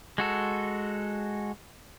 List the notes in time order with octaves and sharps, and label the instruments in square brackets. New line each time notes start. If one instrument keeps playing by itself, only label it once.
[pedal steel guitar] G#3 F#4 A4